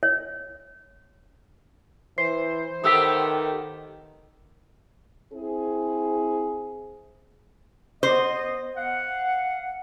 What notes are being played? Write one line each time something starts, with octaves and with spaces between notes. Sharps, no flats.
C#5
E3 C5 C7
D#3 A3 B3 G4 D#6 E6 B6
C4 E4 G#4
B3 C5 D#5
F5 F#5